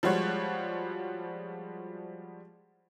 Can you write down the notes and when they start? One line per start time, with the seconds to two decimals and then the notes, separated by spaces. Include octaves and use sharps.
0.03 F3 G3 G#3 F#4 C#5